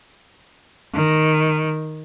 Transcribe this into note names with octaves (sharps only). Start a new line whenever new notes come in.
D#3